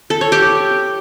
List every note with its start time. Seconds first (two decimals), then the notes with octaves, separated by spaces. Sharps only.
0.10 A4
0.21 C#5
0.32 G4